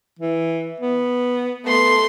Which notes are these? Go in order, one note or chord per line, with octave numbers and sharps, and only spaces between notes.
E3
B3
A3 B3 C6